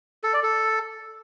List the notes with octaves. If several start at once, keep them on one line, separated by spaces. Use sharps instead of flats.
A4
D5
A4